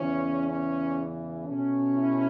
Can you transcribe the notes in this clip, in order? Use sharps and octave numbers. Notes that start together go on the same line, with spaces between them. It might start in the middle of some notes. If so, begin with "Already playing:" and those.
Already playing: E2 C#3 E3 C#4
C#4
B2 A3 C#4
E4